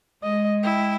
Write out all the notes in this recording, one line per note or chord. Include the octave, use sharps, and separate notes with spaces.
G#3 D#5
E4 G5